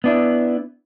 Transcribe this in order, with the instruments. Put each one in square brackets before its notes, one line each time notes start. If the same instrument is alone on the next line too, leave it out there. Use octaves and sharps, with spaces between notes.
[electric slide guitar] B3 D4 E4